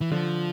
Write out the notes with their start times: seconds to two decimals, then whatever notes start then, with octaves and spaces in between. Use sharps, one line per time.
0.01 E3
0.11 D3 F3